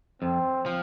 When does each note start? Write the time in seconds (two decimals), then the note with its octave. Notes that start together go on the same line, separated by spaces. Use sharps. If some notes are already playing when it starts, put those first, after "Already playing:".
0.22 F2 C4
0.66 F3